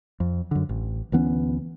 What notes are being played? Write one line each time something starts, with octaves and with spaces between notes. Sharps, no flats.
F2
F#2 D3
A1
D2 E3 B3 C#4